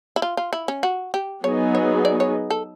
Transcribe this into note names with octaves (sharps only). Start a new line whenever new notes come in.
E4
F4
F4
E4
C#4
F#4
G4
F#3 B3 D#4 G#4 C#5
C#5
D5
C#5
A4